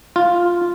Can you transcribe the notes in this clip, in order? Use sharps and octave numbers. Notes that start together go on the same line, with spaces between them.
F4